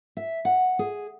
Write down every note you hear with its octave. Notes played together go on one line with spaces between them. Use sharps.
E5
F#5
G#4